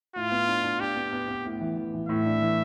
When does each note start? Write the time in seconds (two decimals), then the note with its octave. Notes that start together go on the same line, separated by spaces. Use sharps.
0.16 A2 F4
0.31 B3
0.48 D4
0.63 D4
0.80 D4 G4
0.96 B3
1.13 B3
1.28 B3
1.45 A2
1.61 E3
1.76 E3
1.93 E3
2.09 A2 E5
2.26 D4
2.42 E3